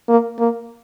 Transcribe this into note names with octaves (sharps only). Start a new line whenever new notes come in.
A#3
A#3